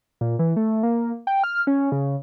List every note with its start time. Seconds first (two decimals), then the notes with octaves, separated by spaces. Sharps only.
0.21 A#2
0.39 E3
0.56 A3
0.83 A#3
1.27 G5
1.44 F6
1.67 C#4
1.92 C#3